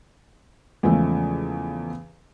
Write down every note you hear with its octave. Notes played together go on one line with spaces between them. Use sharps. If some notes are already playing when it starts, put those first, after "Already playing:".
E2 C#3 F3 G#3 A3